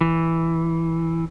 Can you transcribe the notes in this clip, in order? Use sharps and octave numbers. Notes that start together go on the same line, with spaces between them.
E3